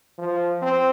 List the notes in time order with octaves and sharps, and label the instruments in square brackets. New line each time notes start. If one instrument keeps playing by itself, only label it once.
[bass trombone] F3
C4